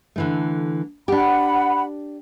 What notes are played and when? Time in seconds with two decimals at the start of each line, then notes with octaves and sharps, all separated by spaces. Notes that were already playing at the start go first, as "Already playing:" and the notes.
0.16 D3 E3 A3
1.08 D4 G4 F#5 B5